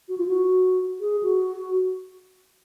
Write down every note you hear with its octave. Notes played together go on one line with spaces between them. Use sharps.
F#4
F4
F#4
G#4
F#4